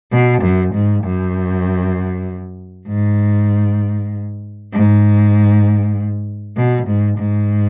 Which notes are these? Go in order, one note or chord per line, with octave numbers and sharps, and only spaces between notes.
B2
F#2
G#2
F#2
G#2
G#2
B2
G#2
G#2